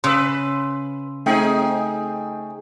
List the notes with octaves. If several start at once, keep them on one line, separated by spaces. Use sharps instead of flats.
C#3 B4 C#5 C6 E6
A3 C4 D#4 G#4 G5